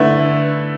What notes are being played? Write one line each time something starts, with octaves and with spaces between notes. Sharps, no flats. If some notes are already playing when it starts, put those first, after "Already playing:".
Already playing: D3 A3 E4 B4